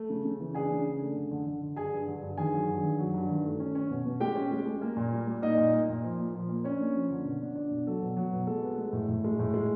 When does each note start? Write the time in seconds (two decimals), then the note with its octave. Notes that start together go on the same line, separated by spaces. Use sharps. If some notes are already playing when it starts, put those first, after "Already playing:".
Already playing: A3
0.10 C#3
0.25 C#3
0.40 E3
0.54 D4 G#4 G#5
0.71 C#3
0.85 D4
1.01 A3
1.15 D3
1.31 D3
1.47 D3
1.62 D3
1.76 G2 G#4 G#5
1.92 G2
2.07 D3
2.22 G2
2.38 D#3 G#4 G#5
2.54 F#3
2.69 G2
2.83 D#3
2.99 F#3
3.14 G2
3.29 D#3
3.44 A3
3.60 C#4
3.75 C#4
3.90 B2
4.05 B2
4.20 G#3 G4 G5
4.36 C#4
4.51 G#3
4.66 G#3
4.82 A#3
4.97 A#2
5.13 G3
5.27 G3
5.42 A#3 D#4 D#5
5.57 A#2
5.73 A#3
5.89 A#2
6.04 F3
6.19 A#3
6.35 F3
6.49 A#3
6.64 C#4 D4 C#5
6.81 A#3
6.95 F3
7.11 D3
7.25 B2
7.42 D4
7.56 D4
7.71 B2
7.87 F#3 A4
8.02 B2
8.17 F#3
8.33 B2
8.47 G#3 A4
8.62 B3
8.78 G#3
8.93 A2
9.09 A2
9.24 G#3
9.39 A2
9.54 G#3